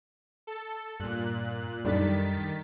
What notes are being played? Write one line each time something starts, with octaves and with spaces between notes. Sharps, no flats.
A4
G2 A#2 F#6
F#2 D#3 G3 D4 A4 A6 B6